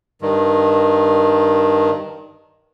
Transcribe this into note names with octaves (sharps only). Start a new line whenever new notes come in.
G2 D#3